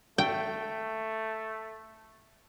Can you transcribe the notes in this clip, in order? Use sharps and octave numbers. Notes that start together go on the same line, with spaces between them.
A3 G5